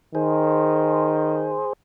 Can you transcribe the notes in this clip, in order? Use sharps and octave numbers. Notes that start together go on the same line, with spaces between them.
D#3 G#4 C5